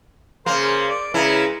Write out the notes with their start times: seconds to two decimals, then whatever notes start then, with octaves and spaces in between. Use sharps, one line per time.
0.46 C#3 A#3 A#4 C5
0.89 D5
1.14 C#3 G#3 E4 B4 A#5